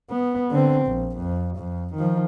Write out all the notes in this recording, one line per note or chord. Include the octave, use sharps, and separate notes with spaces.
B3
D3 C4
A#1
F2
F2
D#3 F3